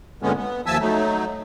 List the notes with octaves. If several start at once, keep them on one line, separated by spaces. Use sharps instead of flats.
G2 A#2 D3 G#3 B3 C#4
B3
D#2 F3 E5 G#5 A5 E6
F#3 A3 D#4